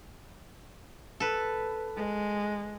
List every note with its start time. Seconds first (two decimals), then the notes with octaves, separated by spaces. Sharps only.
1.20 A4 B4
1.96 G#3